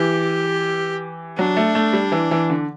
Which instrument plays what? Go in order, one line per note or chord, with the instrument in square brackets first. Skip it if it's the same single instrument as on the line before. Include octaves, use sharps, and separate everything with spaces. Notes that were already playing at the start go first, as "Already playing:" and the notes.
Already playing: [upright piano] E3 [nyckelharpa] G4
[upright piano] F#3 [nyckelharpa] D4
[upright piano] A3
A3
G3
E3
E3
D3